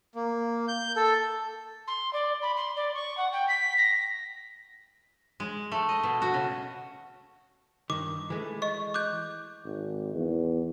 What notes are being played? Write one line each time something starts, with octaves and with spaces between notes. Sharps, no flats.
A#3
G6
A4
C6
D5
B5
C6
D5
C#6
F#5
G5
B6
A#6
G#3
A3
D#5
B2
F#4
C#3
G2 D#3 D6
E3 G#3 A3
D#5 C#6
D6 F#6 G6
G#1
E2